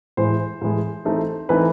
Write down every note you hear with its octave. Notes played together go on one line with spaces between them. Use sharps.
A2 E3 G#3 C5
A2 E3 G#3
E3 A3 C4 D#4
E3 A3 C4 D#4 B4